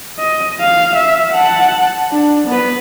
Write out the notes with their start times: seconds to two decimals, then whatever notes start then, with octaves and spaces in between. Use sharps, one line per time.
0.19 D#5
0.61 F5
0.96 E5
1.33 F#5 A5
2.12 D4
2.47 B3 B4